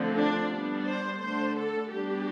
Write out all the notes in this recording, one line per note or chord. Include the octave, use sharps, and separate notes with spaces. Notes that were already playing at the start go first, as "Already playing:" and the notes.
Already playing: D3 F3 A3 C4
D4
G3 B3 D4
C5
D3 A3 D4 C5
A4
G3 B3 D4 G4